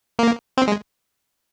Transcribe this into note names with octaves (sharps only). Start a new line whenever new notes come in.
A#3
C4
G#3